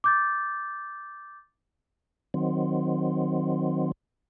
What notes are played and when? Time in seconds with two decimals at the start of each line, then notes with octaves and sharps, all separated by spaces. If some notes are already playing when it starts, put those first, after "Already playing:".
0.04 D6 G6 A6
2.34 D#3 F#3 C4